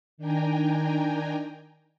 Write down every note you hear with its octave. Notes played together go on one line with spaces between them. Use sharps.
D#3 D4 G5 G#5 A#5